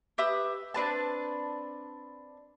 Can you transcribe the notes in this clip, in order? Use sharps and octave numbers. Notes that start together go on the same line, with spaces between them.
G4 B4 E5 D#6
C4 D4 B4 A5